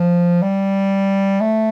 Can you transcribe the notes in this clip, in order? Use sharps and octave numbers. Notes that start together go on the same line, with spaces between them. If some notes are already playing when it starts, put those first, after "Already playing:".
Already playing: F3
G3
A3